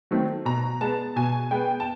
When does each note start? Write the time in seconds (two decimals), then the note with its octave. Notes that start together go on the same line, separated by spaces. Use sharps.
0.11 D#3 F#3 A3 C4
0.45 B2 A#5
0.81 G#3 B3 A5
1.16 B2 G#5
1.51 G#3 B3 G5
1.80 A5